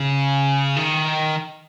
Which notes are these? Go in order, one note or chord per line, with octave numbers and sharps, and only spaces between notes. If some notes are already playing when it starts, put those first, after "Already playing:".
Already playing: C#3
D#3